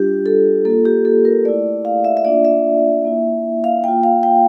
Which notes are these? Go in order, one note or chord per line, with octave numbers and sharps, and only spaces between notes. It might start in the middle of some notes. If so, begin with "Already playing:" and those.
Already playing: G3 D4 F4 G4
A4
A#3 F4 A4
G4
A4
A#4
A3 E4 D5
F5
E5
E5
A#3 D4 F4 D5
E5
A#3 E4
F5
A#3 F4 G5
F5
G5